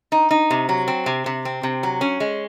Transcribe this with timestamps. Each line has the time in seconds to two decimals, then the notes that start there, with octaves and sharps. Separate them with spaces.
0.12 D#4
0.31 D#4
0.51 C3
0.69 F#3
0.88 C4
1.06 C3
1.26 C3
1.45 C4
1.63 C3
1.83 F#3
2.01 C#4
2.20 G#3